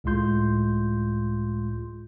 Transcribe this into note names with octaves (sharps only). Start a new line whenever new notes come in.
C#2 A2 G#3 F4 C6 G6